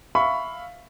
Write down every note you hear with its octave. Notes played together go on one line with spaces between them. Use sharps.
E5 F5 B5 C#6